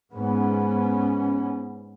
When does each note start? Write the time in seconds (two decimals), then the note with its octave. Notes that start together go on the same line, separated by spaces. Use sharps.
0.13 G#2 B3 C#4